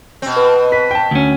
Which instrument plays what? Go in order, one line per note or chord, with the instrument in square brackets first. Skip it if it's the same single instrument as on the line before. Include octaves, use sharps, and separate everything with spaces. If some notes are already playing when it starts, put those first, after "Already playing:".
[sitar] B2 C4
[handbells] B4
[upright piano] B4 [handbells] B6
[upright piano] G5 A5
[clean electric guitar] D2 C#4